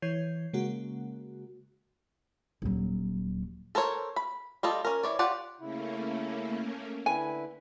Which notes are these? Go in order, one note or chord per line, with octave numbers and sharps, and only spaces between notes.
E3 C#5 G6 G#6 C7
C#3 G#3 A#3 F#4
D#1 F#3
A4 A#4 C5 C#5
B5
G3 F4 A4 D#5
C#4 A#4
E3 C#5 D5
F4 G4 D5 F#5
C#3 A3 A#3 C#4 E4
D3 E4 B4 G#5